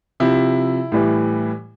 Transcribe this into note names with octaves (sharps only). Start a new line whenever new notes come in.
C3 F3 E4
A2 E3 G3